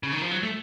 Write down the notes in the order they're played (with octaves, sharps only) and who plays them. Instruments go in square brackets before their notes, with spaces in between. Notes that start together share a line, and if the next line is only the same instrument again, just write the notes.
[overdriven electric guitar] C#3
D#3
F3
F#3
A3